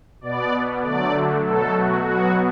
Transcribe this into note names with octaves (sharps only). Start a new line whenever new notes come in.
B2 B3 D5
D3 F#3 A3 D5
B2 F#3 A3 A4
F#4
B2 F#3 B3 F#4